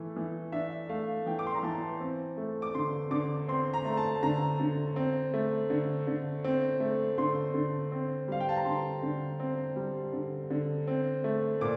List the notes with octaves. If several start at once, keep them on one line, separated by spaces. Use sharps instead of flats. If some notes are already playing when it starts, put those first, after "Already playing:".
Already playing: E3 A3
E3
D4 E5
A3 F5
E3 G5
D6
C6
A#5
E3 A5
C4
A3
D6
D3 C6
D3 D6
C4 C6
A#5
A3
A5
D3 A#5
D3
C4
A3
D3
D3
C4
A3
D3 C6
D3
C4
G3 F5
G5
A5
A#5
D3 C6
D3
C4
G3
D3
D3
C4
A3
A#2 D6